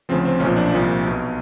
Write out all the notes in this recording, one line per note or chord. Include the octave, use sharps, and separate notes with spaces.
D2 C#3 F3 C4
C4
B1 A#2 F3 C#4
D4
C2 A#2 F3
B1 B2